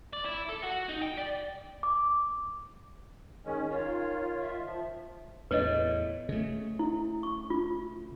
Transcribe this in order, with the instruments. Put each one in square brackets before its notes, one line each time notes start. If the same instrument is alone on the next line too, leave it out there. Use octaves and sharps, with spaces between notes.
[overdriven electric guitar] D5
E4
A4
F#4
D#4
G5
D5
[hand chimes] D6
[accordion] D#3 G#3 C#4
[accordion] D#3 F4 [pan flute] C#5
[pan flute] E5
[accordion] F3
[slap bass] E2 A2 [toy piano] B4 C#5 D#5
[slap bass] C#3 A3
[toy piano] E4
C#6
F4